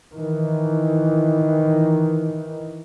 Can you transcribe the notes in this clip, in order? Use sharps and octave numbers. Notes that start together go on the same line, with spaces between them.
D#3 E3